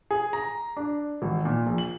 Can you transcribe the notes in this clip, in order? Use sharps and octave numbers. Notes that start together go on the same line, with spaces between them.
G#4
A#5
D4
G#1
A#2
A#1
F#7